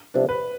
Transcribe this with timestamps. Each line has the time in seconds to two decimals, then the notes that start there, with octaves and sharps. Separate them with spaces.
0.14 C2 C3 F3 B3 D4
0.29 B4